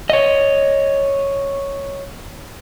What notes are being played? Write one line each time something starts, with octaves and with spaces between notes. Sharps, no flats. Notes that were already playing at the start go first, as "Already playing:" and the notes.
C#5 D#5